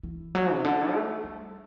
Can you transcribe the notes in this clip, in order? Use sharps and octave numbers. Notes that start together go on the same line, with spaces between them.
E3
F#3
C3
D3
A3
G3